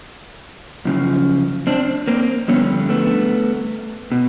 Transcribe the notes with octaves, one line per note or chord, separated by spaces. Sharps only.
F#2 C#3 F3
C4 D4
A#3 C4
F2 D3 G3 B3 C#4
A3 B3
B2